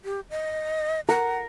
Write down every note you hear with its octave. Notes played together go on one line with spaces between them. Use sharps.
G4
D#5
A#4 F#5